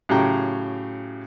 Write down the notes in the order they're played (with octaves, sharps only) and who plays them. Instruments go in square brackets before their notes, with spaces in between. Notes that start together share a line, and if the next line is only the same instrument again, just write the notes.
[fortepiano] A2 C#3 F#3 G4 G5 A#5